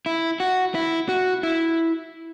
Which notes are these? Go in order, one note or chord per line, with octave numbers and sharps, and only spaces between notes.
E4
F#4
E4
F#4
E4